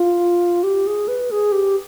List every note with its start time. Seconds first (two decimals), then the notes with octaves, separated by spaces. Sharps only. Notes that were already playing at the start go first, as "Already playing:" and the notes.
Already playing: F4
0.63 G4
0.87 G#4
1.08 B4
1.31 G#4
1.52 G4